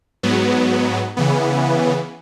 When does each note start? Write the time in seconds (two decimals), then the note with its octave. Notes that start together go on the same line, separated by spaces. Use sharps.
0.23 G#2 F#3 B3
1.17 C#3 E3 B3